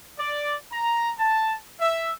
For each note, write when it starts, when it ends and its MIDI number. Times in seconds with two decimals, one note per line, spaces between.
0.18 0.54 74
0.72 1.10 82
1.19 1.57 81
1.80 2.12 76